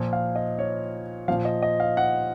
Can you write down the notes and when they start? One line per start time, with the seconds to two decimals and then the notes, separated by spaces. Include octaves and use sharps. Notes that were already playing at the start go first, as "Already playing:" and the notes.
Already playing: A#2 F3
0.13 F5
0.36 D#5
0.59 C#5
1.28 A#2 F3 F5
1.45 D#5
1.62 D#5
1.80 F5
1.97 F#5